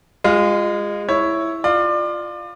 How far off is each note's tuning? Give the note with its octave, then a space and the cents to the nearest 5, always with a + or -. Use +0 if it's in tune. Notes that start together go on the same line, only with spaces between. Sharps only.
G#3 -20 F4 +5
E4 +0 C#5 +0
F4 +0 D5 +30